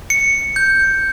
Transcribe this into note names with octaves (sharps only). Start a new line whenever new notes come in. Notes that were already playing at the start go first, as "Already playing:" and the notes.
C#7
G6